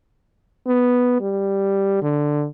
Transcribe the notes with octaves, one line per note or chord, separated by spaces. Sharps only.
B3
G3
D3